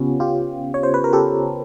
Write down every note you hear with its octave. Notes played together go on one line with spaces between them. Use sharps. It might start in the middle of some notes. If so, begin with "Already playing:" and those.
Already playing: C#3 B3 C#4 F4 G4
F4 G4
C#5
C5
B4
A#4
G4 A4